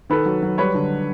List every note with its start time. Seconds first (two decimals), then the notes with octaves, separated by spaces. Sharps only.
0.10 D#3 A4 B4
0.26 F#3
0.42 F#3
0.58 G3 B4 C#5
0.75 D3